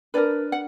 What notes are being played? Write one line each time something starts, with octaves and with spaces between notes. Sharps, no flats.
D4 G4 A#4 B4 D5
F#5